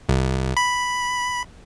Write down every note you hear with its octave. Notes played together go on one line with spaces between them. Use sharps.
C2
B5